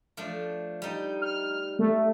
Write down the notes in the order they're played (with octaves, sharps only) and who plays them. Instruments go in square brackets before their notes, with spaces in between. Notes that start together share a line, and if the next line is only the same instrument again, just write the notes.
[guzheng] F3 A3 D4
G3 D#4
[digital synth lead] F6
A3